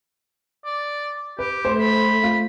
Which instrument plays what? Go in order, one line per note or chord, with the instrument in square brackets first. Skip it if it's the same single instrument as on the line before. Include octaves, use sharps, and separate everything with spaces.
[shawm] D5
[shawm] G4 [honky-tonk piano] B4
[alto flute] A3 [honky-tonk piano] C5 C6
[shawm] B5
[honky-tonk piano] F4